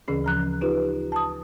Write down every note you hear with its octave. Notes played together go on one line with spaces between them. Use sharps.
D2 C#3 E3 C#4 G#4
F3 A#5 F#6
D#4 F4 G4 B4
A5 D#6